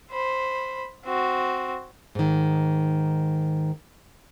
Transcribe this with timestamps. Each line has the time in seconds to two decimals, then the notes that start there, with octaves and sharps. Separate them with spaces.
0.12 C5 B5
1.06 C4 F#4
2.15 G#2 D#3